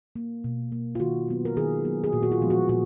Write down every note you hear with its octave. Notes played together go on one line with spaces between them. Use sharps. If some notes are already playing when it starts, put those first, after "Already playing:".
A#3
B2
A#3
F4
D#3 F#4
F#3 B3
A#4
D#3 G#4
F#3 B3
G#4
A#2 F#4
F#4
F4
F3 G#3 B3
F#4
A#2 F#4